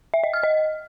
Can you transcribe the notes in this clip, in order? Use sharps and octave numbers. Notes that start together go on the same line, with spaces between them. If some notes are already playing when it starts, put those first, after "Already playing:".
E5
D#5
F6
D#5